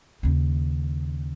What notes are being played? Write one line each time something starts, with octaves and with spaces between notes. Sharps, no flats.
D#2 C#3